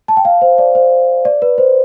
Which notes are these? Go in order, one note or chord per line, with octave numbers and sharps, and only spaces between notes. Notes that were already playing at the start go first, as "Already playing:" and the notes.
A5
G5
F5
C5
D5
C5
D5
B4
C5